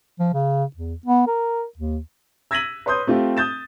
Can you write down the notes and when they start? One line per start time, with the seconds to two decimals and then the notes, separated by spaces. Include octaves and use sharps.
0.20 F3
0.34 C#3
0.77 E2
1.06 B3
1.27 A#4
1.78 D#2
2.51 E6 G#6 A#6 B6 D#7 F#7
2.86 B4 C#5 C6 D#6 G6
3.07 A3 C4 F4 G4
3.37 D#6 G6 A6 E7